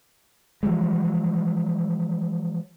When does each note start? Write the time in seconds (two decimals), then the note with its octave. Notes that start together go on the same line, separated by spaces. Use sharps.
0.63 E3 F3 G3 G#3